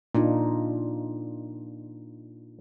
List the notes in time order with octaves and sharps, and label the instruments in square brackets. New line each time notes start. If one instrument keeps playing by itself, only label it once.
[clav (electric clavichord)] A#2 [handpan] D4 D#4 F4